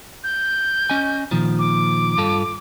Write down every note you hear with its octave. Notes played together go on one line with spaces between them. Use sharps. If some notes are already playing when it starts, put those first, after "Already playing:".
G6
C#4 D#5 G#5
A#2 D#3 F3
D6
G2 F4 A4